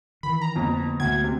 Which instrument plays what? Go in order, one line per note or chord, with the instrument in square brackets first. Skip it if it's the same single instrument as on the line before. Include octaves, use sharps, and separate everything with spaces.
[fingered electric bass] D#3 E3 [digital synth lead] B5
[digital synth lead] A#5
[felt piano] F2 [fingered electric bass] D3 A#3 B3
[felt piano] D2 [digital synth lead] G#6
[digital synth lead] C3